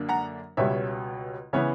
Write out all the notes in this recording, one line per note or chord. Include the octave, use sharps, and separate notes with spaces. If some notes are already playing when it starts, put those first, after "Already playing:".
Already playing: F#2 D3 A#3 D4
F#5 A#5
C#2 B2 G3 C#4 C#5 E5
C#3 E3 B3 C#5 E5